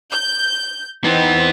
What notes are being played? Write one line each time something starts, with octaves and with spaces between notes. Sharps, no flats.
G6
E3 B3 C4 D#4